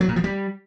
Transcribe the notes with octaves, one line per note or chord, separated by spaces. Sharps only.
F#3
A#2
F3
G3